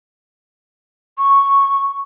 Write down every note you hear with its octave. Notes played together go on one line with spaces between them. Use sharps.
C#6